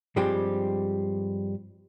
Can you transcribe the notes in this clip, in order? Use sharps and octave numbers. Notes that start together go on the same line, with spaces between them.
G2 F3 G3 G#3 C4 G4